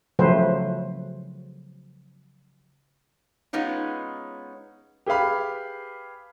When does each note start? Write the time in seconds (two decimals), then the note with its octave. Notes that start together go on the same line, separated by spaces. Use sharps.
0.19 C#3 F3 F#3 A3 B4 C5
3.53 G#3 B3 C#4 D#4 F4
5.06 G4 G#4 B4 F5 B5